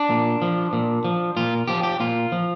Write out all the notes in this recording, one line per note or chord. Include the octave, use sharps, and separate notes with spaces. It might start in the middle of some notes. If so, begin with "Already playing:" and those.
Already playing: D4
A#2
F3
A#2
F3
A#2 F4
F3 G4
G4
A#2 F4
F3